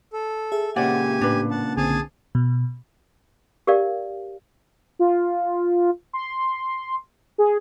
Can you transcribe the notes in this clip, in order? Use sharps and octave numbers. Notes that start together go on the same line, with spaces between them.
A4
G#4 E5
A#2 C#3 G4 C5 D5 F#5 G#5
A2 D4 B4
F#5 A5
B1 D3 C4 G#4 G#5 A5
B2
G4 A#4 D5 F5
F4
C6
G#4